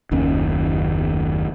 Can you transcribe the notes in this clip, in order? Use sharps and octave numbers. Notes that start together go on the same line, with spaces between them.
F#1 D#2 D#3 C#4